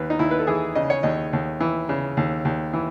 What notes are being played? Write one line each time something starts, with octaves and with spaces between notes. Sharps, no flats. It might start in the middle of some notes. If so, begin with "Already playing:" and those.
Already playing: D#2 B4
D#4
D#2 E4
B4
A4
E3 G#4
C#3 D#5
C#5
D#2 D#5
D#2
E3
C#3
D#2
D#2
E3